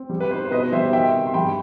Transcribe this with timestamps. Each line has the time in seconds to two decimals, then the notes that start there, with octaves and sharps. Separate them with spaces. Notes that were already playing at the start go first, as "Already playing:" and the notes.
Already playing: C4
0.10 G3
0.20 B4
0.31 D#4 C5
0.45 C5
0.51 B2 B4 D#5
0.72 G3 C5 E5
0.93 D#3 E5 G5
1.14 C3
1.27 C6
1.34 G2 G5 B5